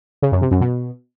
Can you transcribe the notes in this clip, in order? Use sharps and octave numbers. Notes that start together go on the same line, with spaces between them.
C#3
F#2
C3
F#2
B2